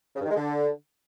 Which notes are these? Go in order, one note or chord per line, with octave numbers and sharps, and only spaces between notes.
C#3
G2
D#3
G#3
D3